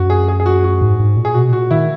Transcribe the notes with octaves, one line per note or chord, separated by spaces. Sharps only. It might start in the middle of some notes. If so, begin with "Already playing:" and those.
Already playing: F#2 F#4
G#4
G#4
G#4
F#4
F#4
G#2
G#2
A#2
G#4
B2 F#4
A#2 F#4
D#3 E4